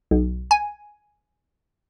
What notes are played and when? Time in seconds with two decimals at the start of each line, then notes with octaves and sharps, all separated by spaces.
0.11 B1
0.51 G#5